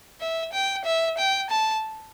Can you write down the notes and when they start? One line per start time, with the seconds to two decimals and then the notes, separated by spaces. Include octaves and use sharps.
0.21 E5
0.53 G5
0.86 E5
1.18 G5
1.51 A5